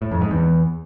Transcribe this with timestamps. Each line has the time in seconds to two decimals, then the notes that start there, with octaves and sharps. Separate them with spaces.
0.02 A2
0.11 F2
0.21 G#2
0.31 E2